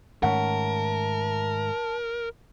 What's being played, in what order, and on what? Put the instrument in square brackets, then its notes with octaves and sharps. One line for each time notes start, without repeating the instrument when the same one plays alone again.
[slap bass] G#2 D#3 A3 [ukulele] C#4 F#5 [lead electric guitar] A#4 [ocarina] A5